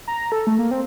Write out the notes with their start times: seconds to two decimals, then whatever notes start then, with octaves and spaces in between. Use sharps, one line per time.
0.08 A#5
0.32 A4
0.47 A3
0.59 A#3
0.71 C4